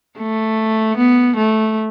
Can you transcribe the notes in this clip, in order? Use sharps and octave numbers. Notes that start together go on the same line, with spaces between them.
A3
B3
A3